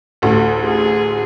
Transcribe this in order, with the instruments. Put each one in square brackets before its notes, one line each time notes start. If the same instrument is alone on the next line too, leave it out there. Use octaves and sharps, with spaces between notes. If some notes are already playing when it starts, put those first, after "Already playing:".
[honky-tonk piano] A1 D2 [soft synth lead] A4
[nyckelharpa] G#4